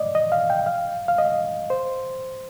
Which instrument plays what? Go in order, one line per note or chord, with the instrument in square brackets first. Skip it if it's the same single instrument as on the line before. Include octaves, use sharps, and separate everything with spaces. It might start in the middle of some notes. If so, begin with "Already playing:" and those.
Already playing: [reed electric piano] D5 D#5
D#5
F5
G5
F5
F5
D#5
C5